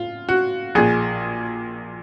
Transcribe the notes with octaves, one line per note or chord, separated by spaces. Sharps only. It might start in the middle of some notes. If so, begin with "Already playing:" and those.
Already playing: F4
F#4
A#1 A#2 G#4